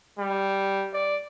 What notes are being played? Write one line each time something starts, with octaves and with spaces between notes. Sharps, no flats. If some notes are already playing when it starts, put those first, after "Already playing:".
G3
D5